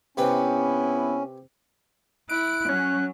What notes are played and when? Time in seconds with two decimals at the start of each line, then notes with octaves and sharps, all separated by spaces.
0.17 C3 B3 C#4 E4 G4 B4
2.29 E4 F#6 D7
2.69 F#3 C#4